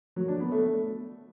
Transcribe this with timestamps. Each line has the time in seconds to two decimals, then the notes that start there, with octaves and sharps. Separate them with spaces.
0.16 F#3
0.28 D4
0.40 B3
0.52 A3